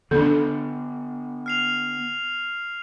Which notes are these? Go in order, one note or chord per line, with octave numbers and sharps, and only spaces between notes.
D3 B3 D4 A4
F6 C7 F7